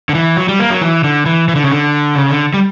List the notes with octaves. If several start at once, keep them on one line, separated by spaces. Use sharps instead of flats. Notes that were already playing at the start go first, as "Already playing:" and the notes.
D3
E3
F#3
G3
A#3
F#3
E3
D3
E3
E3
D3
C#3
D3
C#3
D3
G3